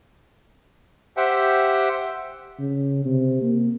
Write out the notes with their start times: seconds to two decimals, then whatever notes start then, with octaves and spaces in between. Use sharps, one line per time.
1.17 G4 C5 E5 F#5 G5
2.59 C#3
3.05 C3
3.42 A#3